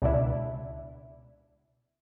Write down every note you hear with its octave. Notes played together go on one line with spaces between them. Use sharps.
C#2 B2 D4 E4